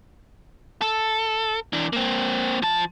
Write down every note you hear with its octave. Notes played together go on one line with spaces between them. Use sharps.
A4
E3 D4
A#3 C4
F3 A5